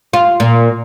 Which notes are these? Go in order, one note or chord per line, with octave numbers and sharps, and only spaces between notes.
F4
A#2